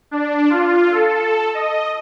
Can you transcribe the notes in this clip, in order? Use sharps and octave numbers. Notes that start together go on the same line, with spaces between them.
D4
F4
A4
D#5